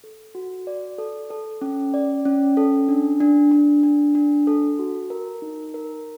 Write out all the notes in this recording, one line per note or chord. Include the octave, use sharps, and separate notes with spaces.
A4
F#4
D5
A4
A4
C#4
D5
C#4
A4
D4
D4
D4
D4
D4
A4
F#4
A#4
D#4
A#4